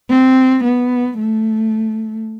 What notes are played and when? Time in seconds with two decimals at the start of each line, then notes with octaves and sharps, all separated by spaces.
0.10 C4
0.64 B3
1.18 A3